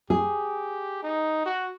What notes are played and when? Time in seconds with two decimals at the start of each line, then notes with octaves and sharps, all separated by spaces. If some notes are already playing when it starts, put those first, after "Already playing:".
0.10 G4 G#4
1.03 D#4
1.46 F#4